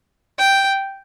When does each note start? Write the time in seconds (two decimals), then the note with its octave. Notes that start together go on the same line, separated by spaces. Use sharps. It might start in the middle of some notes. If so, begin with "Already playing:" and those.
0.39 G5